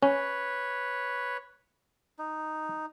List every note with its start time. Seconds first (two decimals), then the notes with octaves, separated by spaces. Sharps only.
0.03 C#4 B4 C#5
2.19 D#4